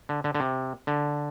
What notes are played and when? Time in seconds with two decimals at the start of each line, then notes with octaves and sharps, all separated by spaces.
0.09 D3
0.24 D3
0.35 D3
0.40 C3
0.87 D3